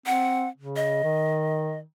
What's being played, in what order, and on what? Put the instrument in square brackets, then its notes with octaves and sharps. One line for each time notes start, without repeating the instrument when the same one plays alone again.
[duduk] C4 [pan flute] F#5
[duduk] C#3
[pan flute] D#5
[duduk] D#3